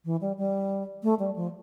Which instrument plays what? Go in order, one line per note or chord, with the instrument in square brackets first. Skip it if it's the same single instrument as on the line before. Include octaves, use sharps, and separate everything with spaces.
[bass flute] E3
G3
G3
A3
G3
F3